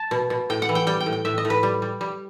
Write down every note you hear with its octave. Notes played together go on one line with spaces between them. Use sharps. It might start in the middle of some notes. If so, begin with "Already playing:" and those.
Already playing: A5
B2
B2
A2 G5
F#5
E3
G5
G3 G5
G5
A2
G5
A2 E5
D#5
A2
B4
G3
G3
G3